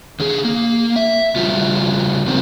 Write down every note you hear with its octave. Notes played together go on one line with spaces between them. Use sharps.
D3 G#4
A#3
E5
C#3 G3 F4 F#4
F3 F#3 A#3 C4 D#4